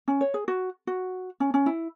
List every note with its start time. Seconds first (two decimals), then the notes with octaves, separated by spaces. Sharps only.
0.08 C#4
0.21 C#5
0.34 G#4
0.48 F#4
0.87 F#4
1.40 C#4
1.54 C#4
1.66 E4